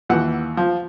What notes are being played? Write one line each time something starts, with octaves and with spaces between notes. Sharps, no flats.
D#2 E3 F#5
F3